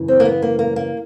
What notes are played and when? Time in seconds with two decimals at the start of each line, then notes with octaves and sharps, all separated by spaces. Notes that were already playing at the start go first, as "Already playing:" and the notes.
Already playing: F#2 C#3 E3
0.08 C4
0.20 A#3
0.25 B3
0.42 A#3
0.59 A#3
0.76 A#3